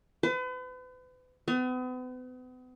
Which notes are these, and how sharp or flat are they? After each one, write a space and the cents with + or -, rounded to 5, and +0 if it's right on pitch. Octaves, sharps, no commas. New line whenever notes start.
B4 +40
B3 +40